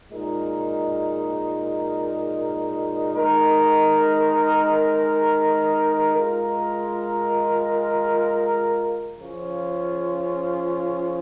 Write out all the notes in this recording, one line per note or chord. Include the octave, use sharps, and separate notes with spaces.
A#2 G#3 D#4 A#4
G#3 D#4 A#4
G#3 F4 A#4
C#3 F3 C#4 F4